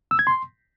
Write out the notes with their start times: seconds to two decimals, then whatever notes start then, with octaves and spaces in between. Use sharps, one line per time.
0.11 E6
0.19 G#6
0.27 C6